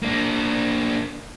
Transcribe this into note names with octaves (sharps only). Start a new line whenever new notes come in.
A#3 D4